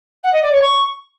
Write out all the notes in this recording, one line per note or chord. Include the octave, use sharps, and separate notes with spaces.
F#5
D#5
D5
C#5
C#6